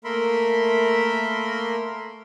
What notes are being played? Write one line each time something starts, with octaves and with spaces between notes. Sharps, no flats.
A3 A#3 A#4 E5 B5 C6